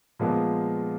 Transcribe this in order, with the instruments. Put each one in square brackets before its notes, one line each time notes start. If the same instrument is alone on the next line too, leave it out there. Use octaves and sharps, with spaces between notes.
[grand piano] A#2 F3 G#3 B3